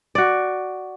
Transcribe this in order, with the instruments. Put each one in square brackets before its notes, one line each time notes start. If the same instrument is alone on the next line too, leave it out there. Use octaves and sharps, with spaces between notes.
[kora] F#4 D5